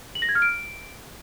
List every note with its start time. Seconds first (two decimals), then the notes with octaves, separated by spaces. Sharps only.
0.15 F#7
0.22 A#6
0.29 G#6
0.35 F6
0.42 D7